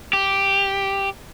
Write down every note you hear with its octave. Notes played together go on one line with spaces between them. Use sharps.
G4